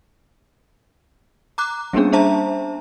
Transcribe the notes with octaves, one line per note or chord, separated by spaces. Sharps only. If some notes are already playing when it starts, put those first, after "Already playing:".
A#5 D6 F#6
G3 A#3 B3 C#4 D4 G#4
D4 C5 E5 A5 A#5